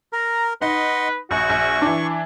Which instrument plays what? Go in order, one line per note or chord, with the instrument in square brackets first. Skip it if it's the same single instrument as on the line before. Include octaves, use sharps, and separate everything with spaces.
[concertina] A#4 [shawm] A#5
[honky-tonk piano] D#4 [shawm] B4 [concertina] D#5 F#5 C6
[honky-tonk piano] A#1 [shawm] F#4 [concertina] C#6
[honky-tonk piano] A#1
E3 D4